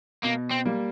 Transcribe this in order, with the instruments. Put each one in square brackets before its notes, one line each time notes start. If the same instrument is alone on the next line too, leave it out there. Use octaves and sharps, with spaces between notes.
[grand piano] B2 [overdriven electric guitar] A#3
[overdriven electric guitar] C4
[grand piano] G3 A#3